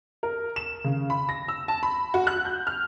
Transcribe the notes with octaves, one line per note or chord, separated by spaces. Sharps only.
A#4
E7
C#3
B5
A#6
E6
A5
B5
F#4
F#6
G6
F6